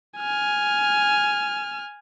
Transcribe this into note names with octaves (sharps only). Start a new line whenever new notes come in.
G#5 F6